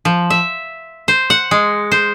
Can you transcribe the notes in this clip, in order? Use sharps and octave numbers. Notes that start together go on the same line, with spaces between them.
F3
E5
C5
F#5
G#3
C5